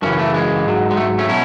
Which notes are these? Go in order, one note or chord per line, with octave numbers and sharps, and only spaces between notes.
F#2 C#3 E3 A3 C#4
A3
G#3
G#2 F#3
G#3
A3
A3 C#4
B2 F#3 C#4 E4